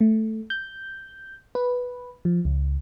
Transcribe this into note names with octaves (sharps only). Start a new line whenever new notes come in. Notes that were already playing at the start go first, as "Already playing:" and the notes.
A3
G6
B4
F3
C#2